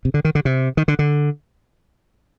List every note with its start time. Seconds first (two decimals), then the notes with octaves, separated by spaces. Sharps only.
0.05 C3
0.14 D3
0.25 D#3
0.35 D3
0.45 C3
0.77 D#3
0.88 D3
0.99 D3